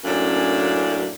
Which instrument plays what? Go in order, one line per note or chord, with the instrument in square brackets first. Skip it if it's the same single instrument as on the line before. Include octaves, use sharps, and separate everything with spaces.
[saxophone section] F#2 A2 A#3 C#4 D4